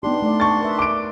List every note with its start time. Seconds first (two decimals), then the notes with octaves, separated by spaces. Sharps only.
0.03 B3 D4 D#4 G4 C6
0.22 A3 D5
0.40 A5 C#6 A6
0.60 A#4 B4 E5
0.79 D6 D7